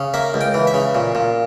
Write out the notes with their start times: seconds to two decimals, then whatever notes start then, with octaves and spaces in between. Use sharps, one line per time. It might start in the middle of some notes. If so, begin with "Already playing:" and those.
Already playing: C#3
0.14 A#3 E5
0.34 C#2
0.41 G5
0.54 E3
0.67 E5
0.74 C#3
0.95 A#2
1.15 A#2